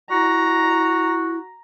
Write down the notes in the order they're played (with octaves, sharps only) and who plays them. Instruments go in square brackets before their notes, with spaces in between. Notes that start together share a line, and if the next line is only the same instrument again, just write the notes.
[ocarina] E4 [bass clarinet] F#4 [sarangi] A#5